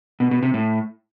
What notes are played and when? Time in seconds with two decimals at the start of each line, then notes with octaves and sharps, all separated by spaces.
0.20 B2
0.31 B2
0.43 C3
0.54 A2